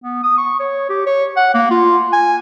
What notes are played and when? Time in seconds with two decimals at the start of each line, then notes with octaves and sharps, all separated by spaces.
0.04 B3
0.23 D#6
0.38 C#6
0.60 C#5
0.89 G4
1.07 C#5
1.37 F#5
1.54 A#3
1.71 F4
2.13 G#5